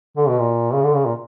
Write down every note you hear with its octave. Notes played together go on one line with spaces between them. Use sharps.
D3
B2
A#2
C#3
D3
C#3
A#2